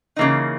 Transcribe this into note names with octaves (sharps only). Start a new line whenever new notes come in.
C#3 E3 A#3 D#4